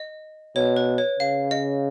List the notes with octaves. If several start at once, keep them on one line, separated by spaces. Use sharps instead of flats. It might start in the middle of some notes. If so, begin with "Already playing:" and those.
Already playing: D#5
B2 C#5
B4
C#5
C#3 F5
D#5